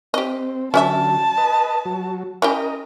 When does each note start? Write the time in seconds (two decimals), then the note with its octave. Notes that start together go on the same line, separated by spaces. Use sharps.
0.14 C4 G4 D#5
0.74 D3 F#3 C#4 D5 E5 A5
1.38 B4 D#5
1.85 F#3
2.42 C#4 E4 G4 A#4 D#5